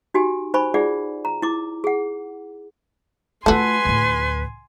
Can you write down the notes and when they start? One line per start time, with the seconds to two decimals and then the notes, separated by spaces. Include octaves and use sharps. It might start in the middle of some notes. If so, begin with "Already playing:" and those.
0.14 D#4 F#4 G4 G#5
0.54 D#4 C5 G#5 B5 C#6
0.74 D#4 F4 G#4 D5 F#5
1.25 A#5
1.42 E4 D6
1.84 G#4 F#5
3.46 A3 F4 F#4 A4 B4 G#5 C6
3.85 D2 A2